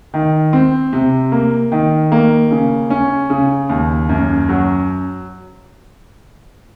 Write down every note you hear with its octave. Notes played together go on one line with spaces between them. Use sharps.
D#3
C4
C3
A#3
D#3
A#3
C#3
C#4
C#3
D#2
F#2
F#3